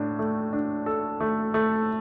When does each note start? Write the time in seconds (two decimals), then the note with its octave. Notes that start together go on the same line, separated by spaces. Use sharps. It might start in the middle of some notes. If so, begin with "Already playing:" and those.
Already playing: A2 D4
0.19 A3
0.53 D4
0.86 A4
1.20 A3
1.54 A3